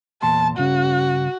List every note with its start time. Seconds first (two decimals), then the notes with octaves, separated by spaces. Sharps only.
0.22 E2 A#2 A5 C6
0.57 G2 C#3 C#4 F#4